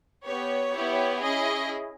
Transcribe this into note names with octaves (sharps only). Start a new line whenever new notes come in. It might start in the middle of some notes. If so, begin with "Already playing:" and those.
B3 G4 C#5
B3 E4 G4
C#4 E4 G#4 D#5